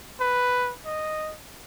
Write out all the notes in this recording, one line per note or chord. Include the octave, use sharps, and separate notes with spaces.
B4
D#5